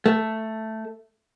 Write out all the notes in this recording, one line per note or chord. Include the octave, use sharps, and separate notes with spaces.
A3